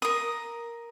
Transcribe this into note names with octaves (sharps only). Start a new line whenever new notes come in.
A#4 D#6